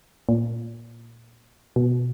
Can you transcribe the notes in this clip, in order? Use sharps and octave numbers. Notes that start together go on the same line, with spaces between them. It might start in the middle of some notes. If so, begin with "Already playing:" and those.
A#2
B2